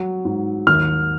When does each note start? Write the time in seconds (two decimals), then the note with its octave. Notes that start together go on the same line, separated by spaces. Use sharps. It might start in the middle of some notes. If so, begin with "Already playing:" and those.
Already playing: F#3
0.25 G#2
0.67 D#2 F6